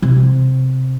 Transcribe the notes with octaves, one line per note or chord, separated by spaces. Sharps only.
C3